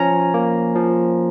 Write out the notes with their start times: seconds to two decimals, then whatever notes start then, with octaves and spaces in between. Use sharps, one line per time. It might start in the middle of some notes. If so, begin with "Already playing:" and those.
Already playing: F3 C#4 G#5 A#5
0.34 A#3
0.76 F3